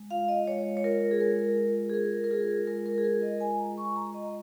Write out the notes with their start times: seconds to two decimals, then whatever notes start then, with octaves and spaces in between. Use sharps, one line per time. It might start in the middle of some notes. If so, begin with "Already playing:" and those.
Already playing: G#3
0.11 F4 F5
0.28 D#5
0.47 G#3 C#5
0.77 C#5
0.84 F4 A#4
1.11 G#4
1.21 G#3 A#4
1.57 F4
1.89 G#4
1.94 G#3 A#4
2.24 A#4
2.31 F4 G#4
2.67 G#3 A#4
2.86 A#4
2.98 G#4
3.04 F4 A#4
3.22 D#5
3.41 G#3 G#5
3.59 A#5
3.77 F4 C#6
3.96 A#5
4.14 G#3 D#5